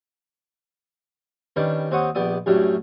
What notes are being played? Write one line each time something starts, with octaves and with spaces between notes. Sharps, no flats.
D#3 G3 C#4 D4 G4 B4
D#2 C4 C5 C#5 F#5 D#6
A#1 B3 G4 D5 D#6
F#2 A2 F#3 G3 D4